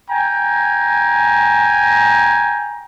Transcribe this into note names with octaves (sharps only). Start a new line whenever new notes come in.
G5 G#5 A#5